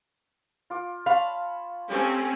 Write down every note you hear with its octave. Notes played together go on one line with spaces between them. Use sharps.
F4 D6
C#5 F5 A5 B5
A3 C4 C#4 G4 A4